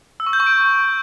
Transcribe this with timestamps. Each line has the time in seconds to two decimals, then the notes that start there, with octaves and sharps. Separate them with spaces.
0.20 E6
0.27 C#6
0.33 G6
0.40 C#6
0.47 D7